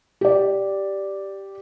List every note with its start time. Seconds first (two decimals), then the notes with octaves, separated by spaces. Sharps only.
0.21 G4 D5